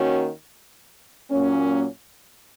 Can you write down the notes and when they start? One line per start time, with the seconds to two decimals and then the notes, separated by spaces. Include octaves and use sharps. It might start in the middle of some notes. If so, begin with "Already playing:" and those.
Already playing: D#3 A#3 C#4 F#4
1.31 A#2 F#3 A#3 C#4